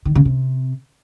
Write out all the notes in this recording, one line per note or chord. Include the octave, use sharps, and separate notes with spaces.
D#3
C#3
C3